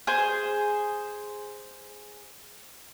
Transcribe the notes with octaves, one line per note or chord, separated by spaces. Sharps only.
G#4 C5